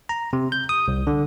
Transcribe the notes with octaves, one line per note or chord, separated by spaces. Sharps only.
A#5
C3
G6
D#6
C2
D3